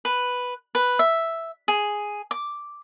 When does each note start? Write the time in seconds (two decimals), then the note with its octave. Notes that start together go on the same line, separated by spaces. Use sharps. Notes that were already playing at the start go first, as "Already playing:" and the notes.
0.05 B4
0.75 B4
0.99 E5
1.68 G#4
2.31 D6